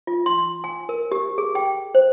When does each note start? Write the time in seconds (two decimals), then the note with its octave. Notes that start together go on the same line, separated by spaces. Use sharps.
0.07 F4
0.26 C6
0.64 G#5
0.89 A#4
1.12 G4
1.38 G#4
1.55 G5
1.95 C5